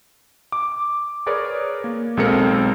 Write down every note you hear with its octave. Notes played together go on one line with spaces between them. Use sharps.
D6
G#4 A#4 B4 C#5 D5
A#3
B1 G#3 C4 A4 A#4 C#7